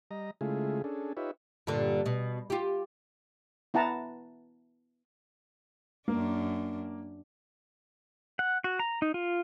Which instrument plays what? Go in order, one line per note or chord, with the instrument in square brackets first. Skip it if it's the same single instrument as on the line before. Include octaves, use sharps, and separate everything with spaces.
[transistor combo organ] G3 D#5 A#5
C#3 G#3 A3 E4 F4 G#4
C#4 D4 G#4 A4
D#4 F4 G4 B4 C#5 E5
[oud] G2 A#2 D3
B2
F4 G4
[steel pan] B3 E4 F#5 A5 A#5
[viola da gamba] F#2 D4 [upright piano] A#3
[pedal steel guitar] F#5
F#4
A#5
D#4
F4